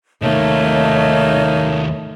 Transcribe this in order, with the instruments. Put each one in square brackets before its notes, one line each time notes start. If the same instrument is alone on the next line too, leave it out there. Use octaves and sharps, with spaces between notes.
[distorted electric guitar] D#2 C3 [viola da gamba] A3 [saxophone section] A#3 D#4 [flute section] C#5 A5